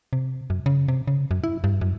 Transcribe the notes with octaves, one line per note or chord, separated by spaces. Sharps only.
C3
F#2
C#3
C3
C#3
F#2
E4
G2
F#2